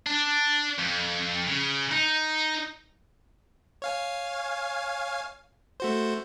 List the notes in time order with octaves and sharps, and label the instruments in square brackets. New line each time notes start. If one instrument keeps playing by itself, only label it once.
[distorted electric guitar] D4
F2
C#3
D#4
[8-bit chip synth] C#5 F5 G#5
A3 F#4 C5